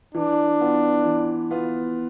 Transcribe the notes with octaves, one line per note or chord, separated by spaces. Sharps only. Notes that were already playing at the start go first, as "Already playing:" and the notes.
E3 D4
B3 F4
E3
B3 F4